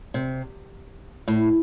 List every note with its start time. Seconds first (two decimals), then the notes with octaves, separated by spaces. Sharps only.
0.14 C3
1.28 A2